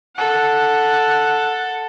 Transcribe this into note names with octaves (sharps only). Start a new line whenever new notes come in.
A4 F#5